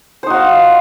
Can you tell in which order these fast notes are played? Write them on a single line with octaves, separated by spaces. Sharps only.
C5 D#4 F#4 F5